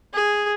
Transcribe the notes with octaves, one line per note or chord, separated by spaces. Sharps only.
G#4